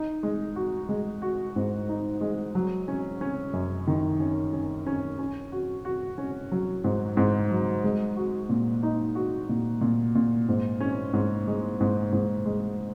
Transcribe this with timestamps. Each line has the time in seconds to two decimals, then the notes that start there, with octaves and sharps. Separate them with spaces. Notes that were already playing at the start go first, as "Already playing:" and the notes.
Already playing: D#4
0.23 G#3
0.56 F#4
0.89 G#3
1.22 F#4
1.56 G#2
1.89 D#4
2.21 G#3
2.55 F#3
2.88 C#4
3.21 C#4
3.53 F#2
3.87 D#3
4.20 C#4
4.53 C#4
4.87 C#4
5.19 C#4
5.52 F#4
5.85 F#4
6.18 C#4
6.52 F#3
6.84 G#2
7.17 G#2
7.51 F#3
7.84 G#3
8.16 F#4
8.49 A#2
8.83 D#4
9.15 F#4
9.49 A#2
9.81 A#2
10.15 A#2
10.48 G#2
10.80 C#4
11.13 G#2
11.48 G#3
11.81 G#2
12.13 G#2
12.46 G#3